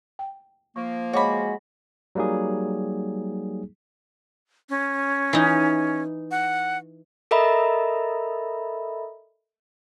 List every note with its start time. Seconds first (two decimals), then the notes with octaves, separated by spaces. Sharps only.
0.19 G5
0.76 F3 A#3 C#6
1.13 G#3 F#4 C#5 D#5 B5 D6
2.15 F#3 G3 A#3 D#4 G#4
4.70 C#4
5.33 E3 D#4
6.31 F#5
7.31 A4 A#4 D#5 E5 A#5 B5